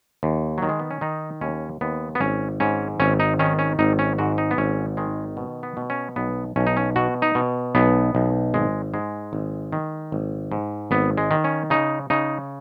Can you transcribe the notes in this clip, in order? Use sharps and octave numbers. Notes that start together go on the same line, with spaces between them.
D#2
D#3 F#3
G#3
B3
C#4
D#3 D#4
D#2 C#4
D#2 B3
B3
G#1 C#4
G#2 C#4
G#1 C#4
D#4
D#3 C#4
C#4
G#1 D#4
C#4
G#2 F#4
D#4
B3
G#1 C#4
D#3 G#3
B2
B3
B2
C#4
B1 B3
B1 C#4
D#4
C#4
B2 F#4
D#4
B2
B1 B3
B1
G#1 G#3
G#2 G#3
G#1
D#3
G#1
G#2
G#1 B3
G#3
D#3
C#4
C#3 D#4
C#3 D#4